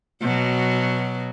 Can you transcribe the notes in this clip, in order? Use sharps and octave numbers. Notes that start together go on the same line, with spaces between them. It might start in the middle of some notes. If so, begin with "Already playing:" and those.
B2 F#3